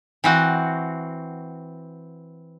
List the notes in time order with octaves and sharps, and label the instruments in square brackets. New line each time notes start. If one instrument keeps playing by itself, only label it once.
[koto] E3 C4 F#4